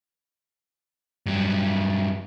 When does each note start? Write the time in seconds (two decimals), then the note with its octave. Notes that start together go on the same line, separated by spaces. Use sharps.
1.26 G2 F#3